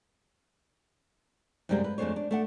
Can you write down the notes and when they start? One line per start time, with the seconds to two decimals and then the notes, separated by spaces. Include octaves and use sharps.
1.69 F#2 C3 G3 G#3 A#3 C4
1.84 B4
1.98 F2 G#3 A3 D4 C5 C#5
2.16 D4
2.31 A3 D4 F#5